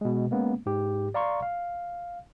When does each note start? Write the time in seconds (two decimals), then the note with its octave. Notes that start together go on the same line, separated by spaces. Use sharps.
0.01 B2 G#3
0.31 G#3 A#3 B3 C#4
0.66 G#2 G4
1.14 D5 F5 A#5 C6 C#6
1.42 F5